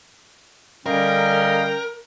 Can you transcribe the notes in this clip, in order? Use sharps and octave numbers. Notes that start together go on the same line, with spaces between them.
D3 G3 C#4 A#4 D#5 F5 G5